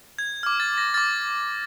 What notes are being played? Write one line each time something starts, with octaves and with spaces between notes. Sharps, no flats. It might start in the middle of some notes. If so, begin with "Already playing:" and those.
G#6
D6 F6 G#6
A6
A#6
D6 F6 A6